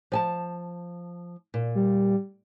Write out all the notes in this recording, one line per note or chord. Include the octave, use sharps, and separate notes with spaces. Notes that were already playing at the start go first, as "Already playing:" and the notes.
F3 G#5 A5
A#2
G3